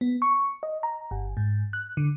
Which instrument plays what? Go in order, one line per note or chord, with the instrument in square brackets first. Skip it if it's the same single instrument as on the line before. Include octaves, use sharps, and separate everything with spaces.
[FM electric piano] B3
C#6
D#5
A#5
G1
G#2
F#6
D3